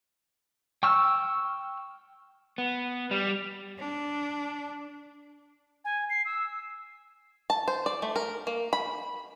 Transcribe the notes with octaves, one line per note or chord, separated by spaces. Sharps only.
G5 C#6 E6 F6
B3
G3
D4
G#5
C7
E6
A5
C5
D5
A3
A#4
A#3
B5